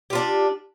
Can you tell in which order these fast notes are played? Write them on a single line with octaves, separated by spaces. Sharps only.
G4 F4 D4